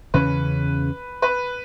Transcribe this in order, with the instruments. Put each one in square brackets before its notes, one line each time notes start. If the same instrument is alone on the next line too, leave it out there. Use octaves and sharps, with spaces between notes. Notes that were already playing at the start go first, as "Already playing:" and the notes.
[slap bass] E2 C#3 E3 C#4 [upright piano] B4
[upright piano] B4